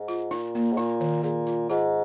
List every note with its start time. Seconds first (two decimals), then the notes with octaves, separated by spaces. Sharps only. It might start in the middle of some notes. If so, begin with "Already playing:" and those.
Already playing: G#2
0.08 F4
0.31 A#2 D#4
0.55 A#3
0.73 G#2
0.77 A#2 D#4
1.00 D#3
1.23 A#2 G#4
1.47 F4
1.69 G#2 F4